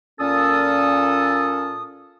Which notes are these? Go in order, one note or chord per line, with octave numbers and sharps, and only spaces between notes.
A#2 C#4 A4 D#6